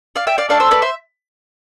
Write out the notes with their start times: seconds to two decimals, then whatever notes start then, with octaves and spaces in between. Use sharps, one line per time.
0.16 D5 F5
0.27 E5 G5
0.38 D5 F5
0.49 A3 D4 A4 D5 F5
0.60 C5 E5
0.71 B4 D5
0.82 C5 E5